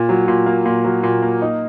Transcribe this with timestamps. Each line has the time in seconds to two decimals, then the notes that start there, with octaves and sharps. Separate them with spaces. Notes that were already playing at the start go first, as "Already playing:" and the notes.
Already playing: A#2
0.09 F#3
0.28 A#2
0.46 A#3
0.65 A#2
0.84 F#3
1.03 A#2
1.22 A#3
1.42 D#4